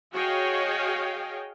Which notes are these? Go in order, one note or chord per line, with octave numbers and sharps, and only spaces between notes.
F#4 G#4 C#5 D#5 F5 G5